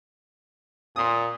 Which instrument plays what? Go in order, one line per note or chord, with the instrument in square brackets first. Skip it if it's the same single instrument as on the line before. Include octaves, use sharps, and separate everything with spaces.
[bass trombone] A#2 [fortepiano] C6 D#6